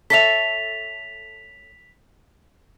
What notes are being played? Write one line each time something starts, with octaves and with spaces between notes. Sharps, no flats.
A4 C#5 E5 B6 F7